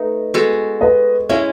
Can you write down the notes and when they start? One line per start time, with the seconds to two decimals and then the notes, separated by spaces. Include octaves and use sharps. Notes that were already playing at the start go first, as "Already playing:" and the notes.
Already playing: A3 D#4 B4 D#5
0.34 G#3 B3 F#4 A4
0.81 B4 D#5
1.29 G#3 C#4 E4 C#5 E5